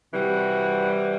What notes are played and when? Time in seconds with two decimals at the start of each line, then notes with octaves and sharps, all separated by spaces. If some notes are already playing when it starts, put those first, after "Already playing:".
0.13 C3 E3 G3 F#4